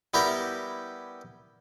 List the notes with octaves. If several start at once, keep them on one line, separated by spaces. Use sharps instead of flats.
G3 B3 E4 G4 A#4